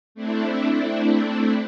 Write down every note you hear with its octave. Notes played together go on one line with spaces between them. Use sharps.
A3 C4 D4 E4